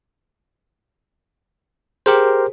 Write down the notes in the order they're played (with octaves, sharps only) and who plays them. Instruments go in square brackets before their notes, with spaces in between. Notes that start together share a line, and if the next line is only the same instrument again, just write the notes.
[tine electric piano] G4 A#4 C5 [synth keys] G#4